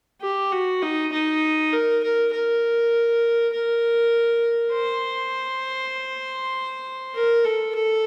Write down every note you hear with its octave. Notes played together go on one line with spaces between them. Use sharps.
G4
F#4
D#4
D#4
A#4
A#4
A#4
A#4
C5
A#4
A4
A4